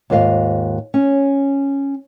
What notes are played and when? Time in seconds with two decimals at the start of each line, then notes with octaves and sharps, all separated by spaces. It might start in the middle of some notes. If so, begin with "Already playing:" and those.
0.10 D#2 G#2 F4 D#5 F5
0.94 C#4